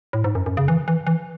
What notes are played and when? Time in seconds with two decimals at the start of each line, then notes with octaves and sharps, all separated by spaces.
0.13 A2
0.24 G#2
0.35 F#2
0.46 F#2
0.57 C#3
0.68 E3
0.88 E3
1.07 E3